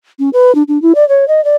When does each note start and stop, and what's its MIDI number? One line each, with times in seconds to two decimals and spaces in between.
0.19 0.29 61
0.33 0.54 71
0.55 0.63 62
0.68 0.81 62
0.82 0.93 64
0.95 1.07 74
1.09 1.27 73
1.28 1.43 75
1.44 1.56 74